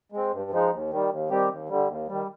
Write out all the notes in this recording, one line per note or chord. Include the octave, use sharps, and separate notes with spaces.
G#3 C4
G2
F3 G#3 D#4
D#2
D#3 G3
D#2
D#3 G3 C4 G4
D#2
D3 G3
D#2
D#3 G3